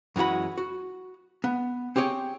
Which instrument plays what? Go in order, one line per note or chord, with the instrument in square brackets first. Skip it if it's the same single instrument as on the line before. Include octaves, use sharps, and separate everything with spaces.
[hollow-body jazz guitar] F#2 E3 G#3 F#4 B5
F#4
B3
C4 G4 G#4 C#5 G5